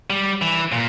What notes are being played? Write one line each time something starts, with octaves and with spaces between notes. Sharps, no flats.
G3
E3
A#2